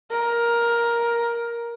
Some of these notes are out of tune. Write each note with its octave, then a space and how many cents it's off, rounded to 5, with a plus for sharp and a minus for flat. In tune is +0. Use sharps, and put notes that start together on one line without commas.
A#4 +10